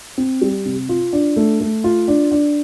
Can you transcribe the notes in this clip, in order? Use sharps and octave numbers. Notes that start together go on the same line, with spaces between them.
C4
G3
C3
F4
D4
A3
A3
F4
D4
D4